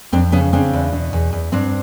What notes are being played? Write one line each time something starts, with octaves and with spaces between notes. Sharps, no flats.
F2 C4 D4
C#3 B3 C#4
C#3 C4 D4
E2
B2
E2
E2
G2 C4 D4